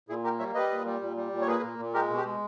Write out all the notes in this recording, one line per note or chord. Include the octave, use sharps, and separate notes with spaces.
A#2 E4 G#4
A#3 G4 A#4
G3 C#5 E5
G3 B4 D#5
A#2
G3
A#2
G3
A#2
C#5
A#3 G#4 B4
A#2
A#2
G#3 G4 A#4
B2
G4
G#3